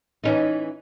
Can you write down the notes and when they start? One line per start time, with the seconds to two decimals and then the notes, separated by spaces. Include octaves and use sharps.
0.24 E3 C#4 D#4